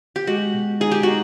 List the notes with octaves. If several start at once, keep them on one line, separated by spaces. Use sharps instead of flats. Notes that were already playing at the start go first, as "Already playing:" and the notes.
G4
G#3 F#4
B2
D#4 G#4
G4
D#4 F#4